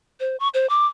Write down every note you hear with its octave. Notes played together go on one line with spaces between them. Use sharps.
C5
C#6
C5
D6